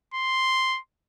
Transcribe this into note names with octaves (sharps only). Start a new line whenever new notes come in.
C6